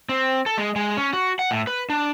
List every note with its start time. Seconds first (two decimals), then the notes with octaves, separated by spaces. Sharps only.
0.09 C4
0.46 A4
0.58 G#3
0.76 G#3
0.97 C#4
1.13 F#4
1.39 F#5
1.51 A2
1.67 B4
1.90 D4